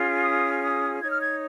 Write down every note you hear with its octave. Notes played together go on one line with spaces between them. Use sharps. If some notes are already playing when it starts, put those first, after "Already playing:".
Already playing: C#4 F4 G#4
D#6
D#6
D#4 C#5 G#6
F6
G#6